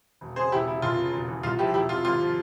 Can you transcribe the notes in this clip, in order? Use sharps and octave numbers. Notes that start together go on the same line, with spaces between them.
E1
C#3 G#4 C5
E1 E4 G4
C#3 E4
F1 F4
C#3
E1
E3
C2 F4
F3 E4 G4
E1 E4 G4
C3 F4
G#1 F4
F3